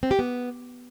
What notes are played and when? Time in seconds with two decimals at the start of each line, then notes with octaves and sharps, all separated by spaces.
0.03 C4
0.11 G4
0.19 B3